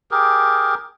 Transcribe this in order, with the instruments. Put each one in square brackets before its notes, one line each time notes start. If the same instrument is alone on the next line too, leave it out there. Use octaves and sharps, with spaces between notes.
[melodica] G4 G#4 A#4